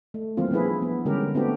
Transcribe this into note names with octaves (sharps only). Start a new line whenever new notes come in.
A3
E3 G3 A#3 C4 F4
F3 B3 D4 E4 G#4 B4
B3
D3 G3 G#3 C#4 G4 A#4
A3 B3 C4 D4 F#4 G4